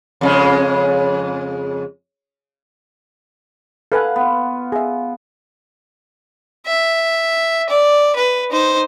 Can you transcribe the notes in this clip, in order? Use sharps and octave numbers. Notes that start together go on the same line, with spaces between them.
F2 C#3 G#3
A4 B4 F5 F#5 G#5
B3 F4
G#4 E5
E5
D5
B4
D#4 C5